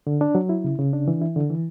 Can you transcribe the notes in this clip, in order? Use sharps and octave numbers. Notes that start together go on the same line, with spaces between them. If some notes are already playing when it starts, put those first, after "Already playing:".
D3
D4
F#3
E4
C#3
C#3
D4
E3
E4
D3
E3